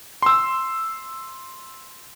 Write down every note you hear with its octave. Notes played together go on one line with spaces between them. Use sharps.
C6 E6